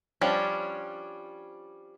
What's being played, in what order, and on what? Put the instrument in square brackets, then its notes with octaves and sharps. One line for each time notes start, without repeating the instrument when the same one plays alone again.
[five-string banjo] F3 G3 C#4 D4